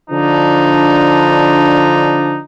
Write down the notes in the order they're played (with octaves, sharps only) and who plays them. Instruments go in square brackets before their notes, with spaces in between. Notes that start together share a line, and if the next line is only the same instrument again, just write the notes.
[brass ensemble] D3 F3 D4 D#4